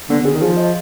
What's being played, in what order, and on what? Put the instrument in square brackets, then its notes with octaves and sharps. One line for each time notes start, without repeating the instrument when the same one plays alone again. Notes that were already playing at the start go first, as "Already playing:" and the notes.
[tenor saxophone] D3 [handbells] B3
[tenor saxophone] D3
[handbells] G#4
[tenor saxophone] D#3
[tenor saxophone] F3 [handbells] G#4
[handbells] D#5